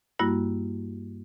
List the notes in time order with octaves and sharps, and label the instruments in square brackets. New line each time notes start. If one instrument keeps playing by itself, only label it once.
[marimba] G2 G3 A#3 E4 F#4